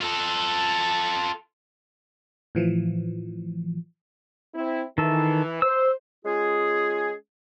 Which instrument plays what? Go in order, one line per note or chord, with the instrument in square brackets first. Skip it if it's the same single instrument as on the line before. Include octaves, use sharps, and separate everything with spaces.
[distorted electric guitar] F4 A4
[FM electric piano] A2 E3 F3
[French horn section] C4 E4
[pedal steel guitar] D#3 A4 [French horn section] E3
[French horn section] C5 [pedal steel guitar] E6
[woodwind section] G#3 C#4 F4 G#4